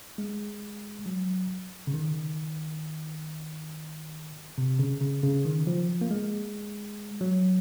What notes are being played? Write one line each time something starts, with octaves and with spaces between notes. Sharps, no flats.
G#3
F#3
C#3
D#3
C3
C#3
C#3
C#3
D#3
F3
A#3
G#3
F#3